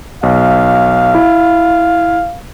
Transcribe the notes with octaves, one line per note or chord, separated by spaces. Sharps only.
B1 F5
E4